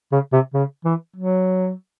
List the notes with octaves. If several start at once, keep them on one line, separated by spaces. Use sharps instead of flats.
C#3
C3
C#3
E3
F#3